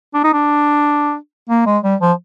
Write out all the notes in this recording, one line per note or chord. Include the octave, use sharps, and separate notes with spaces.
D4
D#4
D4
A#3
G#3
G3
F3